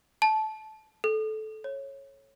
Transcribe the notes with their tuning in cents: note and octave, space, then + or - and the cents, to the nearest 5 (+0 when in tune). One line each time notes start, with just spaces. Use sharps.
A5 -20
A4 -20
C#5 -20